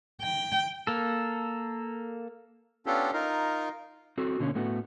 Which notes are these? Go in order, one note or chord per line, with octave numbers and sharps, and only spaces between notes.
G5
A#3 A4
B3 C#4 D4 F4 G4 A4
D#4 F4 A#4
C4 F#4 A4
B2 D3 A#3 C4 C#4
A2 A3 B3 F#4